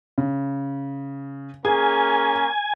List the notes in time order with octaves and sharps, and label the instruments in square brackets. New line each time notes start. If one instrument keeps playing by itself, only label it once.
[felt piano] C#3
[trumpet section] A#3 C#4 [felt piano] G#4 [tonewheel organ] G#5